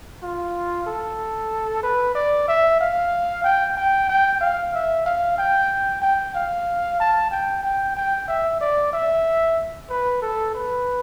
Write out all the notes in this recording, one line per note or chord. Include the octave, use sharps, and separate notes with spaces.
F4
A4
B4
D5
E5
F5
G5
G5
G5
F5
E5
F5
G5
G5
F5
A5
G5
G5
G5
E5
D5
E5
B4
A4
B4